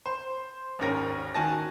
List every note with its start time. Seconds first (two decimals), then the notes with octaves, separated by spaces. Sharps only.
0.06 C5
0.79 G#1 D#2 G#2 C#4 A#4 A#6
1.35 D#3 F#4 G#5 A5 A#6